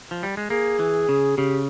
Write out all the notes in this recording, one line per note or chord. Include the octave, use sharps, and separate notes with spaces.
F3
G3
G#3
A#3 G#4
E3
C#3
C#3 G4